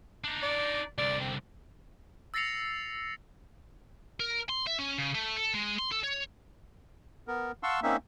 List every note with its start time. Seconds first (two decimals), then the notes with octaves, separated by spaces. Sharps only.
0.24 D4 D#4
0.43 D5
0.98 C2 D3 D5
1.20 C4
2.34 E6 A6 A#6 C7 C#7 F7
4.20 A#4
4.49 C6
4.67 E5
4.79 C#4
4.98 C#3
5.15 A3
5.36 A4
5.54 G#3
5.79 C6
5.92 A4
6.04 C#5
7.28 B3 A#4
7.63 F5 F#5 A5 C6 C#6 E6
7.83 A#3 C4 C#4 D#4 E5